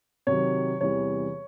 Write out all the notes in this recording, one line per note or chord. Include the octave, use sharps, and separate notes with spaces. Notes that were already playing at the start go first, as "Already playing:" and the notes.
C3 D#3 F#3 C#5
E2 C3 E3 G3 C#5